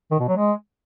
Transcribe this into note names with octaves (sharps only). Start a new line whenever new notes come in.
D#3
B2
F#3
G#3